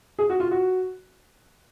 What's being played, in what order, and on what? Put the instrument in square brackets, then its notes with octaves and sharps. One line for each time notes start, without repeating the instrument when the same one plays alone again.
[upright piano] G#4
F#4
F4
F#4